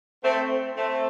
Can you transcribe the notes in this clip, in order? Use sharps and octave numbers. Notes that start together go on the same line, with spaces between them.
A3 C4
A3 C4